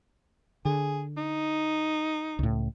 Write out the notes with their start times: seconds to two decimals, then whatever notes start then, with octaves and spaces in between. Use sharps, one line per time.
0.65 D3 G#4
1.17 D#4
2.39 C#2 A2